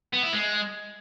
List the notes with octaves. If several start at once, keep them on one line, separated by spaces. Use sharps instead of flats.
B3
E4
G#3